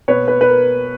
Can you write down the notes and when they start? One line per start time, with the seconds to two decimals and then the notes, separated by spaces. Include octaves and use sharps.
0.08 B2 B4 C#5
0.28 B4
0.41 B4
0.48 A#4